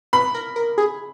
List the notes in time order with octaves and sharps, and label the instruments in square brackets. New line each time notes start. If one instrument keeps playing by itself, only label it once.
[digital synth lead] B4 [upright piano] B5
[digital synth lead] A#4
A#4
G#4